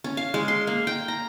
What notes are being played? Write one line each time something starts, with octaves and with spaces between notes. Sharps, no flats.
C#4
F5
G#3
C6
A#3
G5
A#5